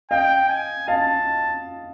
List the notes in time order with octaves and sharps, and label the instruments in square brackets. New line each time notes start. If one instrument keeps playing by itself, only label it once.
[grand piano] D#5 F5 [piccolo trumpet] G5
[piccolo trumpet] G#5
[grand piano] D#5 F5 [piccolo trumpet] A5